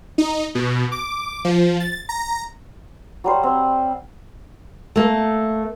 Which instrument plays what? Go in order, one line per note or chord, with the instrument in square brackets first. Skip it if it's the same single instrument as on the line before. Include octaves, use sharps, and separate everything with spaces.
[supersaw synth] D#4
B2
D6
F3
A6
A#5
[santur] F#3 G3 C5
C4
[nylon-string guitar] A3 A#3